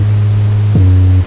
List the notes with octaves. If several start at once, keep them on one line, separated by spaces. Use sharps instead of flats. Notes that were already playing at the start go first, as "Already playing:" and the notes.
Already playing: G#2
F#2